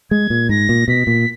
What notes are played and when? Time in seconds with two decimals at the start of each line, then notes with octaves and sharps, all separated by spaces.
0.11 G#3 G#6
0.30 A#2
0.49 G#2 A#6
0.69 A#2
0.88 B2 B6
1.07 A#2